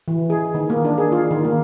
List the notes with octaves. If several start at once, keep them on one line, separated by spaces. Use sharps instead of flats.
E3
G#4
D#3
A#3
D4
G#4
F4
D#3
A#3